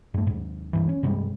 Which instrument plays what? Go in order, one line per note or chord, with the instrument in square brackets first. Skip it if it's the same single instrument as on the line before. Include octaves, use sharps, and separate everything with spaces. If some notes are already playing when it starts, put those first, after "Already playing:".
[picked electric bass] G2 A3
D#2 G#2
G2 E3
C#4
G2 C3 G3 G#3